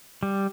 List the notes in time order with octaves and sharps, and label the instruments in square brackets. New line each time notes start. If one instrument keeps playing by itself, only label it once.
[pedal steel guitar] G3